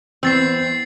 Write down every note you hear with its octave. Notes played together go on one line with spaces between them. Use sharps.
E2 C4 E6 A6 C7